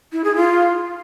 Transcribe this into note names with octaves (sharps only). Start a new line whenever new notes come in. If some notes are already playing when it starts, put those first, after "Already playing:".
E4
G#4
F4